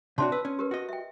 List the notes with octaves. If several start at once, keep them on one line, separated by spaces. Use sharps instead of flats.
C3 D4 F#4 C#5 A5 C6
B4 E6
C#4
G4 A#4 B4
F#4 D#5
E5 G5